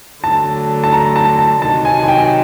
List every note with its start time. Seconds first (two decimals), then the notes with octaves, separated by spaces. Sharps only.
0.24 D3 F#3 A3 A5
0.84 A5
0.93 A#5
1.16 A5
1.39 A5
1.62 C3 D#3 F#3 A5
1.85 G#5
2.03 G#5
2.08 G5